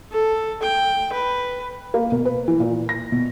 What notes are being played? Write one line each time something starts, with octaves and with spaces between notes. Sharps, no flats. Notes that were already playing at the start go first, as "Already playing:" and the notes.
A4
G5
B4
A#3
B2
B4
E3
A#2
A#6
B2